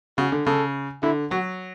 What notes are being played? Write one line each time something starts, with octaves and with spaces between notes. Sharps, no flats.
C#3 F#4
D3
C#3 A4
D3 E4
F#3 F#4